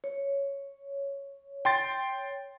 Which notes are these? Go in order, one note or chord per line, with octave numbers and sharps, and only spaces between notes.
C#5
G5 C6 A6